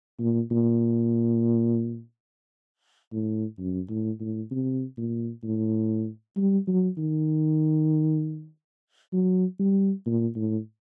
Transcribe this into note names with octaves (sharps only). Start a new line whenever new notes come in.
A#2
A#2
A2
F#2
A2
A2
C3
A#2
A2
G3
F#3
D#3
F#3
G3
A#2
A2